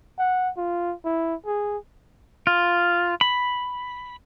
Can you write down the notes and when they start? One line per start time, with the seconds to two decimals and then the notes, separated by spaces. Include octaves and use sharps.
0.19 F#5
0.57 F4
1.05 E4
1.46 G#4
2.47 F4
3.21 B5